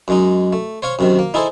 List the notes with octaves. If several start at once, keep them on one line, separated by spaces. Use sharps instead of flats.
F#2 G#3 D#4
A3
C5 C#5 F5 C#6
F#2 C3 D#3
A#3
D#4 E4 G#4 A4 C5